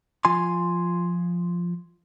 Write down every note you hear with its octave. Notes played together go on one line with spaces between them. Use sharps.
F3 F4 G#5 C6